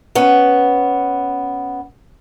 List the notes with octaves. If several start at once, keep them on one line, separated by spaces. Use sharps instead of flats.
B3 C#4